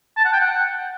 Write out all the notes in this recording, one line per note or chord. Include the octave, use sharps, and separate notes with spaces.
A5
F#5
G5
F#5